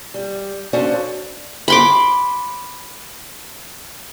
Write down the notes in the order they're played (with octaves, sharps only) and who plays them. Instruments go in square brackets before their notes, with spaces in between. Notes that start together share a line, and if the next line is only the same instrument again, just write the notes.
[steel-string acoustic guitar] G3
C#4 D4 F#4 A4 C5 F5
[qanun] B5 C6 D6